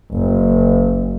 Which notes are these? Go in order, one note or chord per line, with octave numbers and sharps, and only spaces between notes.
F#1